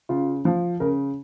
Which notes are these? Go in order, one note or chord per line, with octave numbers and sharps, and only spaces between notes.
C#3 F4
F3
C#3 A#4